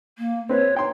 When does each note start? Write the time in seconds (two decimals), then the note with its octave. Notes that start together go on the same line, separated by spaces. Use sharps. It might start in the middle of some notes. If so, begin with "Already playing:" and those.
0.18 A#3
0.49 C4 B4 C#5
0.76 D#4 G5 C6